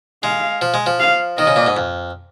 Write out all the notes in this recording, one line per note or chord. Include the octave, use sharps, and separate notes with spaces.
G#3 F5
F3
G#3
F3
F5
D#3 D#5
C#3
A#2
G#2
F2